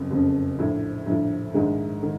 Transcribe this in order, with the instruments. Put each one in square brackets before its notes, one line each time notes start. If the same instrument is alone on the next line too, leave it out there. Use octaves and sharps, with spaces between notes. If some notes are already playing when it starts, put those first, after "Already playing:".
Already playing: [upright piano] F#1 F2
F#1 F2 C#3
A#1 A2 F3
A#1 A2 F3
A#1 G#2 D#3 G#3
D#3